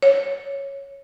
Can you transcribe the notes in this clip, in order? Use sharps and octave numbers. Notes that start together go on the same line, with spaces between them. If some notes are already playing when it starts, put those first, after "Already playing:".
C#5